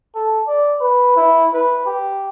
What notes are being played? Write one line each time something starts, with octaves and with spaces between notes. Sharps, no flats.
A4
D5
B4
E4
B4
G4